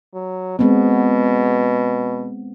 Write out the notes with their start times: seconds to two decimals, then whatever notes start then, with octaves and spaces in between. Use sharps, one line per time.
0.14 F#3
0.59 B2 G#3 B3 C4